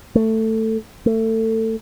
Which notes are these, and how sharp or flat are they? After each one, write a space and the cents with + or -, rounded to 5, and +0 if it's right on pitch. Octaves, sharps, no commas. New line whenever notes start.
A3 +10
A3 +25